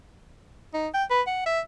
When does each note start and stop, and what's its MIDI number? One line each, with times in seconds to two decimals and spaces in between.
0.74 0.88 63
0.94 1.04 79
1.11 1.21 71
1.27 1.42 78
1.46 1.60 76